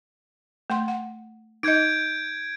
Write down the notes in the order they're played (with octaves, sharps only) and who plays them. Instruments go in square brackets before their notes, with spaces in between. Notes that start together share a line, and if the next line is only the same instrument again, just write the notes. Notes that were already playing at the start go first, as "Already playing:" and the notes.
[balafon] A3 F#5 C6
F#5
[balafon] D#4 D#5 [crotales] G6 G#6 D7